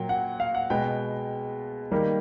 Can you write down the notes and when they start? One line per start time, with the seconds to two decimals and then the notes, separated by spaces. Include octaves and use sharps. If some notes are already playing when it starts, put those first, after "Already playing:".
Already playing: A#2 F#3 A#3 G5
0.09 F#5
0.40 F5
0.55 F#5
0.70 B2 G#3 B3 G5
1.91 D#3 G3 A#3